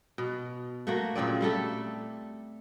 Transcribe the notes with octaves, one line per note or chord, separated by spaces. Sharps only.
B2
A3 A#3 F#4
A#2 C#3 C4 D5
G3 A3 A4